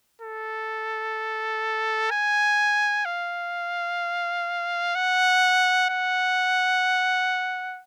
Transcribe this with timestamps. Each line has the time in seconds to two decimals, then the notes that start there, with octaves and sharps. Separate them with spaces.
0.22 A4
2.11 G#5
3.05 F5
4.95 F#5
5.89 F#5